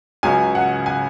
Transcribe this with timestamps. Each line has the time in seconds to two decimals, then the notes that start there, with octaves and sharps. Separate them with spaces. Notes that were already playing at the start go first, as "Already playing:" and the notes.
0.23 C#2 C#3 F#3 C#4 G#5
0.55 F#5
0.86 G#5